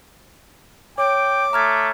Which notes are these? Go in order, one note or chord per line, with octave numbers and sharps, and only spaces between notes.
C#5 G5 D6
A3 A#5 F6 G#6